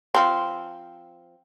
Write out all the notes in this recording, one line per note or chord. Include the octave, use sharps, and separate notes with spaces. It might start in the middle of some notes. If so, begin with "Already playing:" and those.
F3 C4